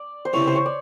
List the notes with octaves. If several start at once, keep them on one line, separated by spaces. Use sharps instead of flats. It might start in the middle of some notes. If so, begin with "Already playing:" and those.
Already playing: D5
C5
C#2 C3 E3 C#5
C5
C#5
D5